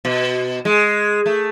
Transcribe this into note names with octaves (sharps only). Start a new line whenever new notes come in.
B2
G#3
A3